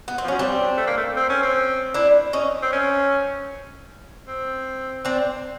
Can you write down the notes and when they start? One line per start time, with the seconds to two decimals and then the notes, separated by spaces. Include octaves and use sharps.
0.08 B3
0.18 C4
0.24 F3
0.28 F#3 C#4
0.39 G3 C4 D4
0.77 A3
0.87 A#3
0.97 A3
1.17 C4
1.30 C#4
1.43 C4
1.94 D4 E4
2.33 C#4 D#4
2.62 C4
2.72 C#4
4.28 C4
5.05 C4 D4